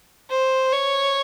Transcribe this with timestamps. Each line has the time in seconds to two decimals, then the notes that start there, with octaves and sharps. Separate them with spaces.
0.30 C5
0.72 C#5